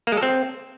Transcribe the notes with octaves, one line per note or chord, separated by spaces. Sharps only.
A#3
G#3
A4
C4